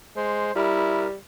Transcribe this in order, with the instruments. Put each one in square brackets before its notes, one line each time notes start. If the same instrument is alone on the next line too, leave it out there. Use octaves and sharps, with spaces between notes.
[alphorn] G#3 [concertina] C5
[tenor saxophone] G3 [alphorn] E4 [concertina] A#4